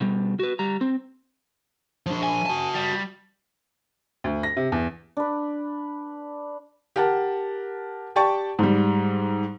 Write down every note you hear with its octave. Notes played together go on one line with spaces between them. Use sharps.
B2 G3
F#4 B4
G3 A#5
C4
F3 D4
G#5
F#4 A5
G3
D2
A#6
C3
E2
D4 B4
G4 A#4 F#5 A5
G4 D5 G5 A5 C#6
G#2 G3